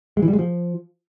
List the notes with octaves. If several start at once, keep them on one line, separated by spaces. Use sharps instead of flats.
G#3
E3
G3
G#3
F3